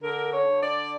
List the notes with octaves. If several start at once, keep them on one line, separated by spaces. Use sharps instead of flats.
D3 A#4
C#5
D3
D5